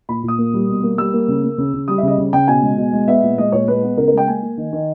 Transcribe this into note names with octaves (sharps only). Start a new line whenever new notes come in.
A#2 B5
A#2
D#6
A#3
G3
B2
A#3
G3 E6
A#3
C#3
A#3
C#3
C#3
G3 D#6
E5
C#3 D#5
C#3
C#3 G5
B2 G#5
G#3
B2
G#3
B3 E5
A#2
G#3 D#5
A#2 C#5
G#3 B4
B3
C#3 A#4
A#4
G#3 G5
A#3 G#5
A#3
D#3
D#3